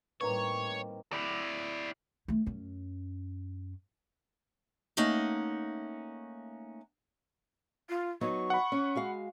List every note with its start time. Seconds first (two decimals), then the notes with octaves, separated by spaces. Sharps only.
0.21 A2 D#3 G3 A#3 C4 B4 C#5 A#5
1.13 E4 D5
2.28 A3 E4
2.46 F#2 C#4
4.97 A3 A#3 C#4 D#4 F#5
7.89 F4
8.21 F#3 B3 D#4 C#6
8.50 F#5 B5
8.72 C#4
8.95 G#3 F#4 F5